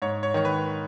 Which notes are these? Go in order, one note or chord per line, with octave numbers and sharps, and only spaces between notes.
G#2 C#5
C#5
D#3 C#5
B4